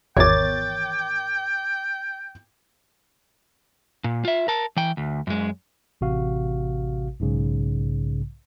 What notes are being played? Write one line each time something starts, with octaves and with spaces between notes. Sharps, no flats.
G#1 E2 A#4 C#5 G5 D6 G#6 A6
A#2
F4 E5
A#4 A5
E3 G5
D2
F#2 G#3
A1 C3 F#4 F5
B1 G#2 C#3